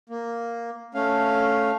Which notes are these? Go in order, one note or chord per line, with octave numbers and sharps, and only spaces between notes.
A#3
A3 C#4 F5